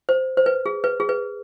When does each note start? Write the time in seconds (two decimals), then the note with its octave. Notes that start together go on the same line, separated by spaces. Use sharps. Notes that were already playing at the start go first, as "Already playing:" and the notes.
0.09 C5
0.37 C5
0.46 B4
0.66 G#4
0.84 B4
1.00 G#4
1.09 B4